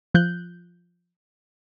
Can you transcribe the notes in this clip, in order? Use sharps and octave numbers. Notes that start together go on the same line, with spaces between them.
F3 F#6 G6